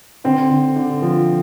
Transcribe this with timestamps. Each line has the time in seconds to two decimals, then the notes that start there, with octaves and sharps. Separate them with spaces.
0.24 D3 C4
0.50 D3
0.76 D3
1.02 F3